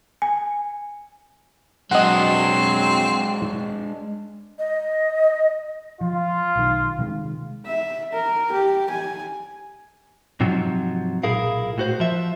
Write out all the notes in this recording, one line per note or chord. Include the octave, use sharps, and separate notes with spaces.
G#5
F#3 G#3 C4 D4 D#5 F#5
D#5
F3 F4
B1 D#3
C3 D#3 G#3
E5
A#4
G4
G#5
G#2 C3 F3 F#3
B1 A#2 E4 G#4 A#4 F5
A2 F#4 C5
F3 E5